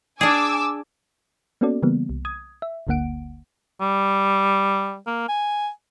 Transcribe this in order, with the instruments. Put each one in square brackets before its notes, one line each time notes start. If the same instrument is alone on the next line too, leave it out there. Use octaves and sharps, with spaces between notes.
[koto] D4 G#4 [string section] G#5 D6 E6
[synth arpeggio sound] A#3 B3 C#4 F#4 A4 D5
C#3 E3 G3 A#3 B3
C2
D#6 G#6
E5
G1 D2 D3 A#3 F#5 D7
[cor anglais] G3
A#3
G#5